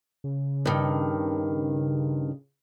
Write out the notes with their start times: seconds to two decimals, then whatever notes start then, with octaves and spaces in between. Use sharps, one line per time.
0.24 C#3
0.65 G2 D#3